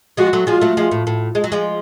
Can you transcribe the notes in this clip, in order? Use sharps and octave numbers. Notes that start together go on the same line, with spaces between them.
F3 G#3 F#4
F#3 A3
F3 G#3 F4
F#3 A3
F3 G#3
A2
A2
G#3
F#3
F3 G#3